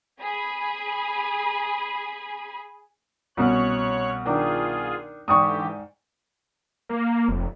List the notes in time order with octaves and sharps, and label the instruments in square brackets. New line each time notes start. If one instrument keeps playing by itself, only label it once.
[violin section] G#4 G#5 B5
[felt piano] C2 B2 [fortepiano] C#4 [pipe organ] C#5 F#6
[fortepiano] D#3 D4 D6 [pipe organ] F4 G#4
[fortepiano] G#2 D5 G5 [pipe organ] D3 E3 G4 [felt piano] C#6 D#6
[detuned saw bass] A#3
F1